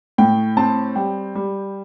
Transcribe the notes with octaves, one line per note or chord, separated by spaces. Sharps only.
A2 G5
C4 A5
G3 G5
G3